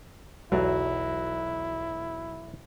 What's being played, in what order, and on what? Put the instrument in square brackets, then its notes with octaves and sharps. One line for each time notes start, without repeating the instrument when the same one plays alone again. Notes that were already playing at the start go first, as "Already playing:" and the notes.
[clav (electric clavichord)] B1 E2 D5 [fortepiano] F#3 [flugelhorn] E4